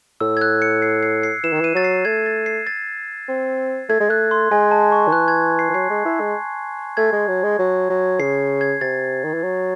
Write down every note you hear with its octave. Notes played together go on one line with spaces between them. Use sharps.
A2 E6
G#6
F#6
C#7
C7
C7
C7
E3 E7
D#3
E3 D#7
F#3 A6
C7
A3 G#6
A6
C7
A6
C4
A3 G#6
G#3
A3 F#6
C6
G#3 G#5
A5
C#6
D#3
E3 F#6
G#6
C7
E3
F#3 C7
G#3
E4
G#3
A3 G#6
G#3
F#3
G#3
F#3
F#3
C#3 C7
G#6
C3 A6
D#3
E3
F#3